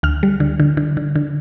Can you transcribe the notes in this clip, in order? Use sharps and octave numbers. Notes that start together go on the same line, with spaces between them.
D2 F6
G3
D3
D3
D3
D3
D3